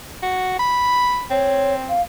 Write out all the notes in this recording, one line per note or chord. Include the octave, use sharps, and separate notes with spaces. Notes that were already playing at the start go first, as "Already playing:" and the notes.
F#4
B5
C4 C#5
F5